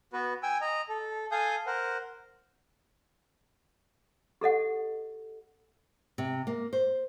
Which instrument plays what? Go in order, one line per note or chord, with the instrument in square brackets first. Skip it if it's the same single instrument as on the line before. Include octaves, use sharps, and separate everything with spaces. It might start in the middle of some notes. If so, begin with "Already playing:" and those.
[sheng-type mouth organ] B3 F#4 B4
G5 G#5 E6
D#5 A#5
A4
A4 F5 G#5 D#6 G6
A#4 C5 F#5
[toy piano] G4 A4 D#5 F#5
[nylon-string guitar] C3
A#3
C5